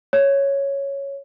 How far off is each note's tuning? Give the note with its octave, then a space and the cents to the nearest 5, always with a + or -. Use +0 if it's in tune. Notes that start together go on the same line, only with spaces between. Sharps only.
C#5 +0